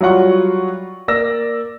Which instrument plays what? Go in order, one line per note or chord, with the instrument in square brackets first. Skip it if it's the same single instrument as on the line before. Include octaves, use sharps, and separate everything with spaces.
[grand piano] F#3 G3 F4 F#5 C#6
A#3 D5 E6 A#6